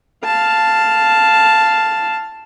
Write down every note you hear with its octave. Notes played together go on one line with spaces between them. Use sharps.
F5 A5